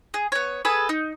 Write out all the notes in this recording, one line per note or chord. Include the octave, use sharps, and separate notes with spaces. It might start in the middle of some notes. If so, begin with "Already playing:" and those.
G#4
B3 C#5
G#4 A4 B4 D#6
D#4